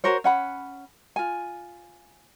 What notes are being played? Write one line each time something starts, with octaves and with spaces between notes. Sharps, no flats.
F#4 A#4 C5 C#5
C#4 F#5 B5
F4 G#5